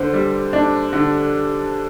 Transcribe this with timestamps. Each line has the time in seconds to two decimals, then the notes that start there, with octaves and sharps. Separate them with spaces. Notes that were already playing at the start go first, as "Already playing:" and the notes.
Already playing: D3 C5
0.13 G3
0.53 D4
0.93 D3